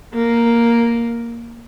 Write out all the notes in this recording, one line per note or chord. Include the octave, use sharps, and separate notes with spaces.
A#3